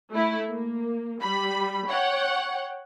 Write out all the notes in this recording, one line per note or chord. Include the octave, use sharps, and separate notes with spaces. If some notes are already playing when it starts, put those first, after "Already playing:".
A3 E4
A#3
G3 B5
C#5 F#5 G5